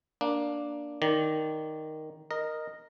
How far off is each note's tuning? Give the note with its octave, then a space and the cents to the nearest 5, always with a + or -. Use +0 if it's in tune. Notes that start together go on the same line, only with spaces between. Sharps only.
A#3 +10 D4 +0
D#3 +0 D5 +0
A#4 +0 D#5 -10